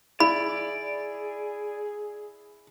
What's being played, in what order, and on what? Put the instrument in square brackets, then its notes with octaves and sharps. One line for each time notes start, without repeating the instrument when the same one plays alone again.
[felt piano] E4 [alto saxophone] G#4 [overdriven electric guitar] D5 [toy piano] B5